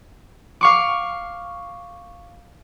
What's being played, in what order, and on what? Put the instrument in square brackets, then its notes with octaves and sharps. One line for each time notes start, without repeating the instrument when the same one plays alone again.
[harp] F5 C#6 D6